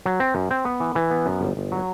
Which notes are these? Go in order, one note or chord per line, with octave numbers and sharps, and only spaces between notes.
F#3
C4
F#2
C4
B3
E3
E3
B3
F#2
G1
G1
F#3